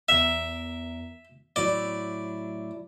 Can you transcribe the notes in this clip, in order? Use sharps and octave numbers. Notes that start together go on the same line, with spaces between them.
E2 A#4 E5
A2 F#3 E4 D5